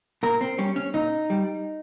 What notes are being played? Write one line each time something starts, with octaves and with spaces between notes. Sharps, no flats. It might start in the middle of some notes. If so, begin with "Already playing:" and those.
A#2 A#4
C4
G3 C#4
C#4
A#2 D#4
G3